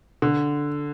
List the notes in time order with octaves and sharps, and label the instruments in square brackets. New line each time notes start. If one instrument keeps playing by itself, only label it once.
[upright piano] D3